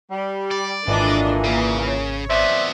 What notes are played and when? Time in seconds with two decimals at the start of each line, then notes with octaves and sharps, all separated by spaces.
0.11 G3
0.51 D5
0.88 G#1 A#2 E3 D4 A4 D#5
1.44 C#3 A#3
1.85 C#5
2.30 F2 B3 C5 D5 E5